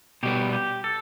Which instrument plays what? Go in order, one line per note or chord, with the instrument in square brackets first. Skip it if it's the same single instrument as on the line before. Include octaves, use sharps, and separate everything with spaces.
[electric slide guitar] B2 G3 B3 [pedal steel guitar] G4
[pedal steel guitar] G4
A4